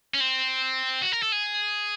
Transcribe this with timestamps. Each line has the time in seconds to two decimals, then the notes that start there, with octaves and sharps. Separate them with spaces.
0.14 C#4
0.20 C4
1.02 F#4
1.12 A#4
1.22 A4
1.32 G#4